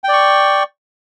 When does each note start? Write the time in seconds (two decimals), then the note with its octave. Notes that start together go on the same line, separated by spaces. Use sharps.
0.04 G5
0.08 D5
0.13 C#6